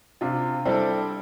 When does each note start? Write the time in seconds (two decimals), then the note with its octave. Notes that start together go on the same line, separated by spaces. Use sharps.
0.21 C3 D4 F4
0.65 G3 C4 D4 E4 A4